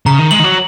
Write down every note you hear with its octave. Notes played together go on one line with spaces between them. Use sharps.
C#3 A#5
D#3
G#3 F#7
D#3
F#3